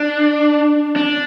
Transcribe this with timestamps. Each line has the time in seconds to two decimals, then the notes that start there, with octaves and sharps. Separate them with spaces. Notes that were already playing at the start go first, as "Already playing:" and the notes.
Already playing: D4
0.96 D4